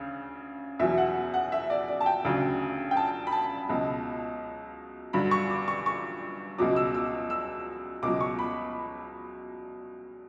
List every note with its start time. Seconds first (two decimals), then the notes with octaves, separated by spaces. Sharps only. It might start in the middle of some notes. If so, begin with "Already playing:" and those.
Already playing: D2 C#3
0.79 E2 B2 F#3 E5
0.98 F#5
1.34 F#5
1.52 E5
1.70 D5
1.88 D5
2.01 A5
2.06 G5
2.25 D2 C#3 F#3
2.91 G5
2.97 A5
3.27 B5
3.32 A5
3.69 C#2 B2 F#3
5.13 G2 D3 F#3 B5
5.31 C#6
5.50 D6
5.68 C#6
5.86 C#6
6.58 C#2 B2 F#3 D6
6.76 E6
6.94 E6
7.30 E6
8.03 C#2 B2 F#3 D6
8.21 C#6
8.39 B5